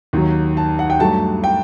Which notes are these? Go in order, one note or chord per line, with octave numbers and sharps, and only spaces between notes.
D#2 D#3 F#3
A5
F#5
G5
G2 F#3 A3 A5
G5